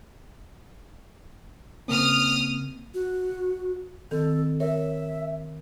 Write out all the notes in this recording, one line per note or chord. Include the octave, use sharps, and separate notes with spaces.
C#3 A#3 C4 D#6 F6
F#4
D#3 C4 A4
A#4 C#5 E5